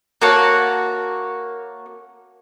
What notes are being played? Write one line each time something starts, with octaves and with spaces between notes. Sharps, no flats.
A#3 F#4 C#5 A5